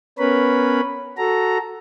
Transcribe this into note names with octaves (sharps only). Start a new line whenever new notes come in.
B3 C#4 A#4 B4 C#5 B5
F#4 A4 A#5